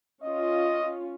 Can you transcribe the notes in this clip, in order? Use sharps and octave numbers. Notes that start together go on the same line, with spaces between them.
C#4 F4 D#5